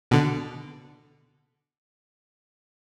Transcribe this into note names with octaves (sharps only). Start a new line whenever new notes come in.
B2 D3